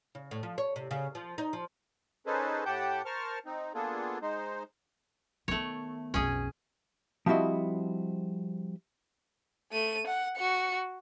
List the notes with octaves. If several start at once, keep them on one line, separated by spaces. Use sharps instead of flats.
C#3
A2
F3
C#5
C3
C#3
F3
D#4
F3
C#4 D#4 G#4 A4 B4 C5
A2 G4 F#5 G5 A5 G6
A#4 C5 A5 C#6 F6
C4 D#4
A#3 B3 D4 F4 G#4 A4
G#3 D#4 C5
D#3 A3 B3 C#5
B1 F2 C#4 G#4
F3 G3 C4 E4 F#4 D#5
A3 D#7
F#5
F#4 C#7